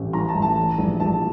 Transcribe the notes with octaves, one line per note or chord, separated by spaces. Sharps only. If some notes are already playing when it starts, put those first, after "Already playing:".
Already playing: A1 A2
E3 A#5
A5
A1
A5
E3
A#1
A#1 A5